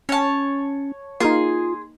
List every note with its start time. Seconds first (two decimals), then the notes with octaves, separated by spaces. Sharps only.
0.09 C#4 C#5 A5
1.20 A#3 D#4 F4 G#4 C6